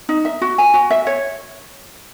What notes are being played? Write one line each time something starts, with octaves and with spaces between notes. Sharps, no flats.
D#4
E5
F#4
G#5
F#4
E5
C#5